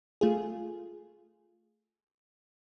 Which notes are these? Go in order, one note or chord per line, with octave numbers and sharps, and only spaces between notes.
A3 F4 G#4